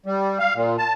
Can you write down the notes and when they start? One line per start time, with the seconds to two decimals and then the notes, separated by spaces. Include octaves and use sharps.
0.06 G3
0.39 F5
0.55 A#2
0.78 A5